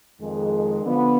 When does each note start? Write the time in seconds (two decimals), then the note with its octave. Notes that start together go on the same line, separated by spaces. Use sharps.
0.20 F2 D#3 G#3
0.82 D3 F3 B3 F4